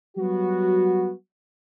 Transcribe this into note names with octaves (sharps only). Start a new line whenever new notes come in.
F#3 G3 B3 F#4